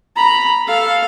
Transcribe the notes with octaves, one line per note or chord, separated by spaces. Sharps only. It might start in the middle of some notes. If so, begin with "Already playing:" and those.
A#5 B5
A4 F5